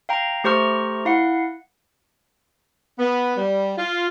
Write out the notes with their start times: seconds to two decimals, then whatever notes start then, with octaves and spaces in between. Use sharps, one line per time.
0.09 F5 G5 A#5
0.44 A3 G4 C5 A#5 C#6 F6
1.05 E4 F5 F#5
2.99 B3
3.36 G3
3.77 F4